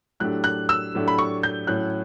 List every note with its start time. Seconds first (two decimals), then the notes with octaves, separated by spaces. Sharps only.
0.20 A2 F#3 A3 D4 G4 F#6
0.44 F#6
0.69 E6
0.94 A2 F#3 A3 D4 G4
1.08 B5
1.18 C#6
1.43 G6
1.67 A2 F#3 C#4 F#6